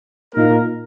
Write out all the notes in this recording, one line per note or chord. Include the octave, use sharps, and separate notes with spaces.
A#2 A#3 D#4 A#4